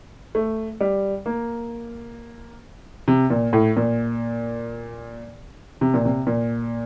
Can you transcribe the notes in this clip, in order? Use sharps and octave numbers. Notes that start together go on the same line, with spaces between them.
A3
G3
A#3
C3
A#2
A2
A#2
C3
A#2
C3
A#2